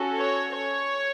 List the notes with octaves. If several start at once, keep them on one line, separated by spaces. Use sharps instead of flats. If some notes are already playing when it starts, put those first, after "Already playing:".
Already playing: C#4 F#4 A4
C#5
C#5